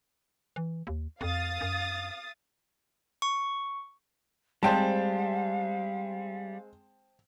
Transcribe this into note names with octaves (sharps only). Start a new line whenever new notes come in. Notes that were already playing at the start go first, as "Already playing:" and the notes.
E3
D#2
F2 F5 D#6 A6
F#2
C#6
G3 G#3 C4 C5 F5 G5 A5